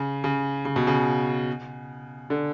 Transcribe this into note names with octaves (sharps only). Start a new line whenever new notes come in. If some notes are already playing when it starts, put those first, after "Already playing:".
Already playing: C#3
C#3
C#3
B2
C#3
D3